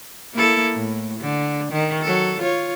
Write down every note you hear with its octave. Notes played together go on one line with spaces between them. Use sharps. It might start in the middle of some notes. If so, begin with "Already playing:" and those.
A#3 E4 A4
A2
D3
D#3
F#3 A4
F4 C#5